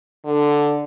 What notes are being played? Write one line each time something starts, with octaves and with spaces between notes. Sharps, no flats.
D3